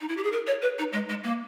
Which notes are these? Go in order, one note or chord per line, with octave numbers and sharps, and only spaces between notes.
D#4
E4
G4
G#4
A#4
C#5
B4
D#4
G#3
G#3
A#3